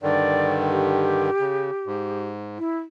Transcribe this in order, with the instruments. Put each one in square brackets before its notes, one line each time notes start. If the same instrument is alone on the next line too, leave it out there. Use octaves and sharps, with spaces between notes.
[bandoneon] G2 D3 D#3 [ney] D5
[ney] G4
[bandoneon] C#3
G#2
[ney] E4